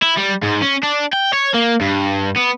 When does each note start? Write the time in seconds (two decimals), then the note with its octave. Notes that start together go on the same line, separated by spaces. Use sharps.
0.02 E4
0.17 G3
0.42 G#2
0.62 C#4
0.83 D4
1.13 G5
1.33 C#5
1.54 A#3
1.81 G2
2.37 B3